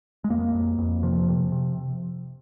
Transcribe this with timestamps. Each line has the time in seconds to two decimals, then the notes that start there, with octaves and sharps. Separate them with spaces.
0.24 G#3
0.30 F2 A#3
0.55 F2
0.78 F2
1.03 C3 F3
1.28 C3
1.52 C3